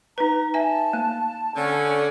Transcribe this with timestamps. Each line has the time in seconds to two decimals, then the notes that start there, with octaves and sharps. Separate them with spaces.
0.18 D#4 B4 A#5
0.54 E5 G#5 A5
0.93 A#3
1.55 D3 C#4